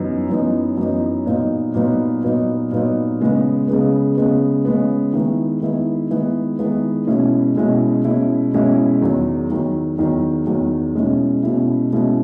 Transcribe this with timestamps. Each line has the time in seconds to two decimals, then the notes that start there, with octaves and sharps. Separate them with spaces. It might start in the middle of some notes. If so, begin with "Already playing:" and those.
Already playing: F#2 E3 B3 D#4
0.30 F#2 E3 B3 D#4
0.77 F#2 E3 B3 D#4
1.26 A#2 F#3 B3 D#4
1.75 A#2 F#3 B3 D#4
2.23 A#2 F#3 B3 D#4
2.72 A#2 F#3 B3 D#4
3.20 C#3 G#3 B3
3.68 C#3 G#3 B3
4.17 C#3 G#3 B3
4.65 C#3 G#3 B3
5.13 D#3 G#3 B3 E4
5.61 D#3 G#3 B3 E4
6.11 D#3 G#3 B3 E4
6.59 D#3 G#3 B3 E4
7.07 B2 G#3 C#4 E4
7.56 B2 G#3 C#4 E4
8.05 B2 G#3 C#4 E4
8.53 B2 G#3 C#4 E4
9.01 E2 D#3 F#3
9.50 E2 D#3 F#3
9.98 E2 D#3 F#3
10.47 E2 D#3 F#3
10.95 B2 G#3 C#4 E4
11.43 B2 G#3 C#4 E4
11.93 B2 G#3 C#4 E4